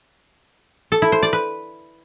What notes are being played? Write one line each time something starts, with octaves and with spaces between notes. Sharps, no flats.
A4
E4
C5
D5
B4